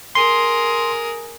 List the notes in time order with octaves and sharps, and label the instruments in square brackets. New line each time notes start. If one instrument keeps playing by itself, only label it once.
[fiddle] G#4 A#4 [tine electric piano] C6